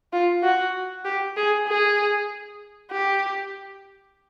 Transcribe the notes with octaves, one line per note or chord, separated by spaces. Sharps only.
F4
F#4
G4
G#4
G#4
G4